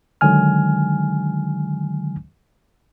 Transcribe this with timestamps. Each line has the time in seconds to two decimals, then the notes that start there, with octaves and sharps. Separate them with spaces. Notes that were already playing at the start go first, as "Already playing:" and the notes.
0.21 D3 D#3 F#3 G#3 G#5 F6